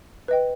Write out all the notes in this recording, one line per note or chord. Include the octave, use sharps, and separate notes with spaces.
B4 D#5 G5